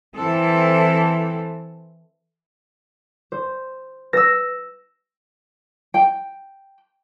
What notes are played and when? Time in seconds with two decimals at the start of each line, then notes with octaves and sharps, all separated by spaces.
0.16 E3 C4 A4
3.32 C5
4.13 B4 E6 A#6
5.94 G5